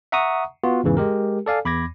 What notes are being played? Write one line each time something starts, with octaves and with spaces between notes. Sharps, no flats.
E5 F#5 A#5 C#6 D#6
B3 F4 F#4
E2 G#2 C#3 E3
G#3 G4 A#4
A4 D5 F5 G#5
E2 B5 D6 G#6 A#6